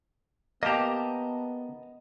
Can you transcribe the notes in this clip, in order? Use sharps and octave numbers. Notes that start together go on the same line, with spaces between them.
A#3 B3 G4 D#5 A5 A#5